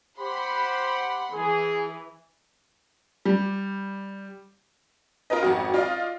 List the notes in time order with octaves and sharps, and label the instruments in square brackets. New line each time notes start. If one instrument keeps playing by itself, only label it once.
[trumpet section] G4 C5 [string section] F#5 B5 C6
[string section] E3 [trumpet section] G#4
[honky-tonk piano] G3
F4 A#4 B4 D#5
G#1 F2 F#4
F4 D5 D#5 F5